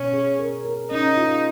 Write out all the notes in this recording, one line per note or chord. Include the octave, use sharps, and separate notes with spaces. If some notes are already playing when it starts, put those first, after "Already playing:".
Already playing: B2 C#4
G#4
A#4
A#4
C#4 D#4
F4